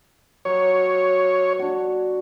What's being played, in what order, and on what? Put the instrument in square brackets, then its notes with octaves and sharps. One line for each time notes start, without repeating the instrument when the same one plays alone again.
[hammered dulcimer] F#3 [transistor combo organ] C#5
[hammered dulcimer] D4 F#4